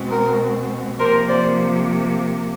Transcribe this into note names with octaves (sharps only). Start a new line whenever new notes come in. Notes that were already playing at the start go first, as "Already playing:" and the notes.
Already playing: B2 G#3 C4
A#4
C3 F3 A#3 A#4 C5
C5 D5